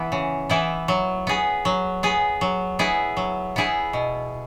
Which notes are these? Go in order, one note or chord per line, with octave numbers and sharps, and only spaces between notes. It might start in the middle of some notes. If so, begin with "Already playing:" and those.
Already playing: E3 B3 E4
C#3
E3 B3 E4
F#3
B3 G#4
F#3
B3 G#4
F#3
B3 E4 G#4
F#3
B3 E4 G#4
B2